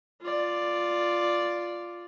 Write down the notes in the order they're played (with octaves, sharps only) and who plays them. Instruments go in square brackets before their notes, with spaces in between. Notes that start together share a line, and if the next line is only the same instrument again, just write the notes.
[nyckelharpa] F4 D5